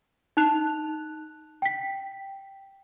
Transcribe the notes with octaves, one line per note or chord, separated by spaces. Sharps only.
D#4 A5 F#6 F7
G5 B6